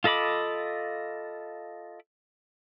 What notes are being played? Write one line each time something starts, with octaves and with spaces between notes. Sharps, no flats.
F4 A4 D#5 B5 D6